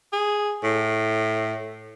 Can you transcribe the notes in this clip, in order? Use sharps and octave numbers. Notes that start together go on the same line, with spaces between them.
G#4
A2